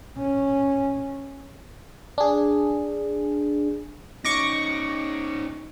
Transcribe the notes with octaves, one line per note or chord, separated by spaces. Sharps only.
C#4
D4 G#4
C#4 D#4 C#6 D6 A#6